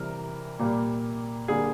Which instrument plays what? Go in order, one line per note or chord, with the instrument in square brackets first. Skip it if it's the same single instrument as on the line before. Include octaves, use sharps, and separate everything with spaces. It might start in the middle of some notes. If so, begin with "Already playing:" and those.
Already playing: [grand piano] C3 E3 G3 A#4
A#2 G3 A#3
D3 G3 A#3 G#4